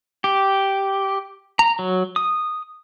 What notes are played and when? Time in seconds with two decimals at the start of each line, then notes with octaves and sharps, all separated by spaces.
0.24 G4
1.59 A#5
1.79 F#3
2.16 D#6